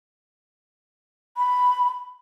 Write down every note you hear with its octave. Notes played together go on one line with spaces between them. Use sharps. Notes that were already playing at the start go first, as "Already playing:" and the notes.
B5